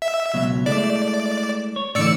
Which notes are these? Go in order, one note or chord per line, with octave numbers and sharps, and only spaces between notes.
E5
C#2 B2 F#3
G#3 A3 E4 D5
C#5
A2 D3 E3 D5 E6 C#7